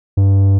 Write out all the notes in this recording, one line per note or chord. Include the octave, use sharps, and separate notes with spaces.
G2